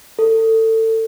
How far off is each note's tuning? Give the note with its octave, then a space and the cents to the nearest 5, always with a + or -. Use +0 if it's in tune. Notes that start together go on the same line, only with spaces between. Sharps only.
A4 +25